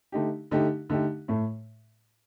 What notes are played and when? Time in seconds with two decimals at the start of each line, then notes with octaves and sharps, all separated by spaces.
0.12 D3 A3 D#4 G4
0.51 D3 A3 D#4 G4
0.90 D3 A3 D#4 G4
1.28 A2 A3